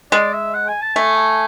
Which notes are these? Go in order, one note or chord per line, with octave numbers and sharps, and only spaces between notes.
G#3 D5
E5
F#5
G#5
A5
A3 G#5
G#5